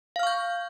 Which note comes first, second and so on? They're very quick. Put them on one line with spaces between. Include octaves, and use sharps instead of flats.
F5 F6 C#6 G6